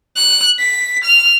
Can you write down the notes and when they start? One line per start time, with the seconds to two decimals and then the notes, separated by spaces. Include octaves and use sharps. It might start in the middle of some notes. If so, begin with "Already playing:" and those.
0.16 F#6
0.59 B6
1.04 F6